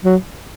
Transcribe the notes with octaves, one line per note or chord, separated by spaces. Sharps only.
F#3